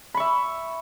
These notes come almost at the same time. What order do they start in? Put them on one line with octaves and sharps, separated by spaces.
B5 C#6 E5